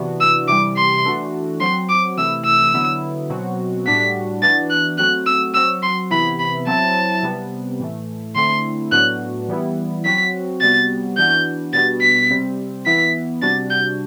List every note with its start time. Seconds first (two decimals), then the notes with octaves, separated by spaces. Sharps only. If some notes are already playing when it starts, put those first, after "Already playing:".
Already playing: C3 E3 B3 D4 F#4
0.21 E6
0.48 C3 E3 G3 D6
0.77 C6
1.05 E3 A3 D4 F#4
1.61 F#3 C4 F#4 C6
1.89 D6
2.17 C3 E3 A3 E4 E6
2.45 E6
2.74 D3 F#3 B3 E4
3.30 B2 F#3 C4 F#4
3.86 A2 G3 D4 F#4 B6
4.42 E3 B3 D4 F#4 A6
4.70 F#6
4.98 F#3 A3 C4 F#4 F#6
5.26 E6
5.54 F#3 C4 F#4 E6
5.83 C6
6.11 C3 E3 B3 E4 B5
6.39 B5
6.67 F#3 C4 E4 A5
7.23 C3 G3 B3
7.80 A2 E3 A3
8.36 D3 A3 C4 E4 C6
8.92 A2 F#3 B3 D4 F#4 F#6
9.49 E3 G3 B3 E4
10.05 F#3 C4 F#4 B6
10.61 C3 G3 B3 F#4 A6
11.17 E3 B3 D4 F#4 G6
11.73 B2 G3 B3 D4 F#4 A6
12.02 B6
12.31 C3 G3 C4
12.86 E3 B3 E4 B6
13.42 C3 G3 D4 F#4 A6
13.70 G6